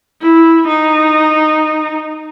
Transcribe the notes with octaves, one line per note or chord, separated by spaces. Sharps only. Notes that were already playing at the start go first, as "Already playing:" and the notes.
E4
D#4